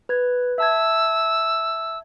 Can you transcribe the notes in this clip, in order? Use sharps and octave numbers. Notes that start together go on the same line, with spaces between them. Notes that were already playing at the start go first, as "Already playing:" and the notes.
B4 G#6
E5 A5 E6 G#6